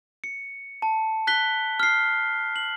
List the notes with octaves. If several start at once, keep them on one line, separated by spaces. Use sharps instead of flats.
C#7
A5
F#6 B6 G7
F6 C7
F#7